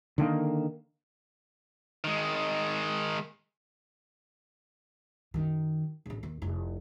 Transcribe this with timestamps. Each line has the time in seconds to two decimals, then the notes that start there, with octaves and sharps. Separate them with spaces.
0.18 D3 D#3 A#3
2.04 D#3 G#3
5.34 F#2 D#3
6.06 D1 A1
6.23 D#2
6.42 F1 E4